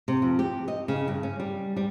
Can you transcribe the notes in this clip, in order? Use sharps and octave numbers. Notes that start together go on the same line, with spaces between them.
C3
F2
G4
D#5
C#3
G2
C#4
G3
G3